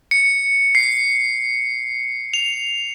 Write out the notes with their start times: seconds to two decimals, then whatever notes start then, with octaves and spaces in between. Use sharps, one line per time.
0.11 C#7
0.75 C7
2.34 F7